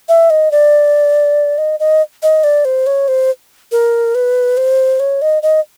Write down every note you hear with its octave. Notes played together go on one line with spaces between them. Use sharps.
E5
D#5
D5
D#5
D#5
D#5
D5
C5
C#5
C5
A#4
B4
C5
C#5
D#5
D#5